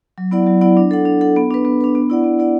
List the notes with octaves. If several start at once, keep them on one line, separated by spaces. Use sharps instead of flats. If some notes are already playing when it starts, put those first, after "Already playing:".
F#3
B3 E4 D5 F#5
F#3
B3 E4 D5 F#5
D4
A4 F#5
D4
A4 F#5
B3
D4 B4
B3
D4 B4
B3
E4 D5 F#5
B3
E4 D5 F#5